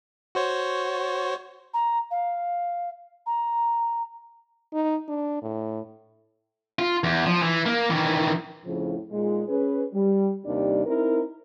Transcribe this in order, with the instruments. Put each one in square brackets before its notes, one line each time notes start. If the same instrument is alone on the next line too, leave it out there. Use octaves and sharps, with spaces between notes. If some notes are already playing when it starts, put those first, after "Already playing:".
[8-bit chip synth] F#4 C5 C#5
[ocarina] A#5
F5
A#5
[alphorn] D#4
D4
A2
[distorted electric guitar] F4
E2
F3
E3
A#3
D#3 E3
[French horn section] F2 A2 C#3 F3
A#2 G#3 D#4
C#4 G#4 B4
G3
D#2 C3 D#3 G3 D4 D5
C4 D#4 E4 A#4